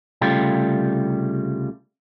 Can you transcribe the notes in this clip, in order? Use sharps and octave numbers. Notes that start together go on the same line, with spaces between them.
C2 C#3 G3 A3 F4 G5